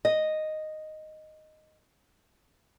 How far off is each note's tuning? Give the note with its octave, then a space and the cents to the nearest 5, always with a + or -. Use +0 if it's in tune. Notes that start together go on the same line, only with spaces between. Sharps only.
D#5 -5